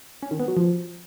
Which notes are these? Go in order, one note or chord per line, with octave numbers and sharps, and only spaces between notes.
C#4
D#3
B3
F#3
F3